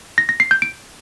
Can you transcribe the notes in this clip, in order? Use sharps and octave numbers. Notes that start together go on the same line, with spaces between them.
A#6
A#6
C7
G6
D7